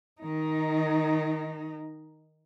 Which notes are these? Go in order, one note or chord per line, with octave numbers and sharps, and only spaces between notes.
D#3 D#4